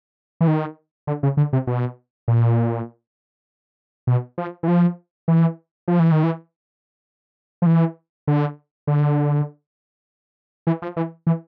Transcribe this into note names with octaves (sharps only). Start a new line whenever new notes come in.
E3
D#3
D3
C#3
D3
C3
B2
A#2
B2
F3
E3
F3
E3
F3
E3
D#3
E3
F3
E3
D3
D3
E3
F3
E3
E3